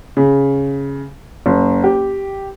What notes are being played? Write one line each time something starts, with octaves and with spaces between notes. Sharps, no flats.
C#3
F#1
G4